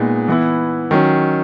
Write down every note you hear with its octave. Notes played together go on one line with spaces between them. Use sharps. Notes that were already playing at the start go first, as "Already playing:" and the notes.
Already playing: A#2 G#3 B3 D#4
E3 B3 E4
D#3 F#3 C#4